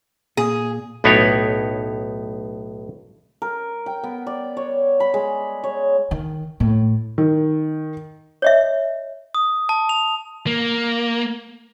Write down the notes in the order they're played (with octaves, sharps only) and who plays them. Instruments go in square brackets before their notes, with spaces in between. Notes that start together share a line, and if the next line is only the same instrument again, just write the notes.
[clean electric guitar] A#2 [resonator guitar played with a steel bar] G#4
[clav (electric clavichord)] B1 A2 B3 D#4 G4 C#5
[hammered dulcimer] A#4
G5
B3
D5
C#5
B5
G#3
C#5
[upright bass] D#3
A2
[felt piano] D#3
[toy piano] C#5 D#5 E5
[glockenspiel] D#6
A5
F7
[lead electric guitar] A#3